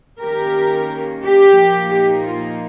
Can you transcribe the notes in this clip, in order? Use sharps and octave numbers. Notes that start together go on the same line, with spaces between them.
D#3 A#3 C#4 G4 A#4
G4
A#2 F3 A#3 D#4
F4